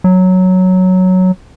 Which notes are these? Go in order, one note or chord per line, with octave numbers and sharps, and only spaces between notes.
F#3